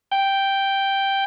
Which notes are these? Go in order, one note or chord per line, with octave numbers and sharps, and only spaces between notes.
G5